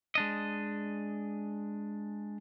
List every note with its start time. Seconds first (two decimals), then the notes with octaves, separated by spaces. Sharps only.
0.15 G#3 D4 D#5